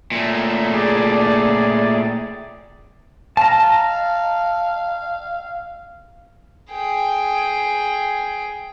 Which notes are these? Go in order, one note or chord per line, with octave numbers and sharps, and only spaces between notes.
A#2 A3
G#4 D5
F5 A5 A#5
G#4 G5